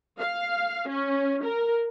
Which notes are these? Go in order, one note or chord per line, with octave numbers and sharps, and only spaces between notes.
F5
C#4
A#4